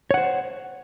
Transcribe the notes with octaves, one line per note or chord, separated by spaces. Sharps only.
C5 C#5 F#5